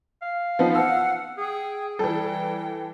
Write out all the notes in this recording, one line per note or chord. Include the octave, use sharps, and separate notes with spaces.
F5
F3 B3 D#4
F#5 E6
G#4 G5
E3 G3 A4 G5